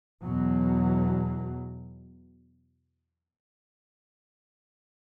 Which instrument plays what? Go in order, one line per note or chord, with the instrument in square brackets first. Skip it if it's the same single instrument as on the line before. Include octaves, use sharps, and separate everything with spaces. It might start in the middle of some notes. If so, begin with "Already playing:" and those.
[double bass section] E2 B2 F#3